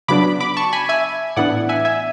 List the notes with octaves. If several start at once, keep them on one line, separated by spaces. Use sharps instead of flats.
C#3 F#3 B3 D4 B5 D6
B5 D6
A5 C#6
G#5 B5
E5 G#5
A2 E3 B3 D4 D5 F#5
E5 G#5
E5 G#5